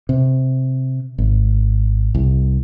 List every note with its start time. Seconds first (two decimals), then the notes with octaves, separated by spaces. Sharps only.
0.09 C3
1.18 G#1
2.15 C2